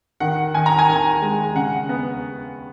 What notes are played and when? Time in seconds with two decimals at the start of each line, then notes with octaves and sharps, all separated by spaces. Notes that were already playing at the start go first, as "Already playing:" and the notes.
0.20 D#3 F#5
0.55 D#3 G#5
0.66 A#5
0.79 G#5
0.89 D#3
1.22 G#3
1.55 C#3 F#5
1.89 B3